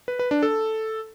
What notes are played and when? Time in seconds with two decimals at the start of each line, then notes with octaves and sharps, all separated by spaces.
0.08 B4
0.19 B4
0.31 D4
0.43 A4